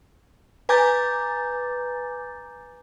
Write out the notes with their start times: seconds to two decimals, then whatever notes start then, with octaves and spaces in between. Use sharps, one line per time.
0.69 B4 G#5 A#5 D6 G6 A6